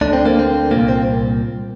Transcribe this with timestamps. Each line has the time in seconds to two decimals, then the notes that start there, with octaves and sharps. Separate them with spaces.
0.01 D2 D3 D4
0.13 C4
0.26 A#3
0.39 C4
0.71 C2 A#2 A#3
0.88 C4